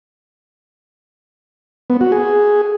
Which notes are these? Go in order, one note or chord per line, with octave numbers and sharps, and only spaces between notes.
B3
F#4
G#4